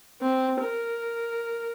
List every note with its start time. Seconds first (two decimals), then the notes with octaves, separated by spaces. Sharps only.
0.21 C4
0.60 A#4